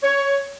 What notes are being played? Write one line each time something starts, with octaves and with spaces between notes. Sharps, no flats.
C#5